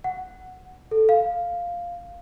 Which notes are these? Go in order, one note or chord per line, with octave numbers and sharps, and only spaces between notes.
F#5
A4
F5